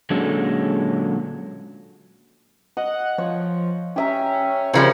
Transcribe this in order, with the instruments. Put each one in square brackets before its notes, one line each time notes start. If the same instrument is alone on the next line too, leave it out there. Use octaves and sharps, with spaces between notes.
[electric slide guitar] A#2 D3 F#3 G#3 C#4 A4
[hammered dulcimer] D#5 [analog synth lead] F#5
[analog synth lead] F3 [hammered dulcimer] C#5
[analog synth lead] C#4 [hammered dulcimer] G4 E5 A#5
[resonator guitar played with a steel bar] C#3 F3 G3 [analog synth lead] C4 [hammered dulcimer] A#4